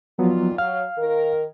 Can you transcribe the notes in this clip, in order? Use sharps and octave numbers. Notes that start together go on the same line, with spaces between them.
A#2 D#3 F3 F#3 B3 F4
F#3 F5 F6
D#3 A#4